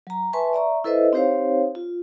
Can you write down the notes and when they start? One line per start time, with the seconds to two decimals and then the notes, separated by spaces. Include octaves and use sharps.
0.07 F#3 A#5
0.33 B4 E5 G#5 A5 C6 C#6
0.53 D5 E5 A#5 C#6
0.84 E4 A4 B4 C5 D#5 E5
1.13 C4 D#4 G4 C5 C#5 F5
1.75 F4